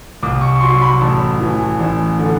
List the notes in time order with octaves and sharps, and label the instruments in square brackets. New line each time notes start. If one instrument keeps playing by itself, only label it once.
[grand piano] C2 D6
C#6
C#6
F#3 C6
B5
A1 A5
E3
A1
D3